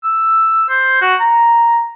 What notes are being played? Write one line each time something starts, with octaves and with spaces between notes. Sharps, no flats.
E6
C5
F#4
A#5